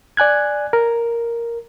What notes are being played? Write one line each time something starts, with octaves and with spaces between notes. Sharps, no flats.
D5 G#5 F#6 G#6
A#4